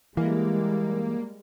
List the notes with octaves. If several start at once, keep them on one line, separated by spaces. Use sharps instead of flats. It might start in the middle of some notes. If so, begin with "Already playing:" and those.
E3 G3 G#3 A#3